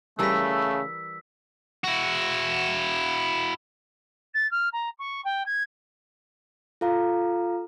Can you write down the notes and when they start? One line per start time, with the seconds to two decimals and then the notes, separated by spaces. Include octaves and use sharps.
0.19 C#3 E3 G3 A3 A#4 E6 B6
1.84 E4 F#4
4.34 A6
4.51 F6
4.72 A#5
4.98 C#6
5.24 G5
5.46 G#6
6.81 F4 A4 F5 A#5